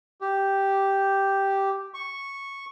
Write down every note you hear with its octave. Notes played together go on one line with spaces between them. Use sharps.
G4
C#6